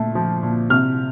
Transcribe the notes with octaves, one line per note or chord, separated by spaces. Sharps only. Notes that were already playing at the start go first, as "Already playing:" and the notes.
Already playing: A#2 A3
F3
A#2
C3 F6